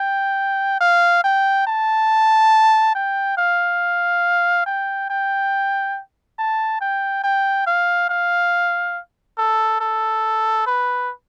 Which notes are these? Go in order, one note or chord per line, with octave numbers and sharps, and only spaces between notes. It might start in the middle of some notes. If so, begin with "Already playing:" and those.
Already playing: G5
F5
G5
A5
G5
F5
G5
G5
A5
G5
G5
F5
F5
A4
A4
B4